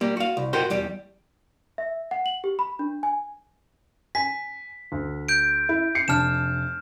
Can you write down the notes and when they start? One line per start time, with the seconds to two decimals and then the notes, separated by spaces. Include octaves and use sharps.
0.01 G3 A#3
0.17 F#4 F5
0.37 C2
0.53 F4 F#4 A#4 C5 F#5 G5
0.70 E2 G3 G4
1.78 E5
2.11 F#5
2.26 F#7
2.44 G4
2.59 B5
2.79 D4
3.03 G#5
4.15 G#5 B6
4.92 D2
5.28 G6 D7
5.69 E4
5.95 C7 C#7
6.08 F1 D4 A5 F6 E7